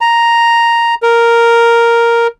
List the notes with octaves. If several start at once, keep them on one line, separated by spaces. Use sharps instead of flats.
A#5
A#4